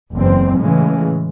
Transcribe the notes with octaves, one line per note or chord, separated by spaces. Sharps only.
F#1 E2 C4
A2 C#3 E3 G#3